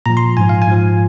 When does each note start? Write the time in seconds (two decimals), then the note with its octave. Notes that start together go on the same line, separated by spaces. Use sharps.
0.06 A#2 F3 A#5
0.17 C6
0.37 G#2 F3 G#5
0.49 F5
0.62 G#5
0.67 G#2 F3